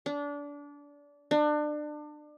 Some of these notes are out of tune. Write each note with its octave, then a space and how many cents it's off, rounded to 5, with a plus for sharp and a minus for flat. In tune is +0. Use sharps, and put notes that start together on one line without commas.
D4 -25
D4 +30